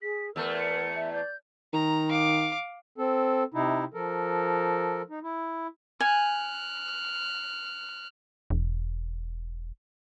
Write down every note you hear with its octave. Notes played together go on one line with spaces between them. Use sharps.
G#4 B6
E2 A3 A#4 E6
C#7
E5
D5 G6
D#3 A#5
F5 D6
C4 A4
C3 D#4 E4
F3 A4 A#4
D#4
E4
G#5 F6 F#6
E1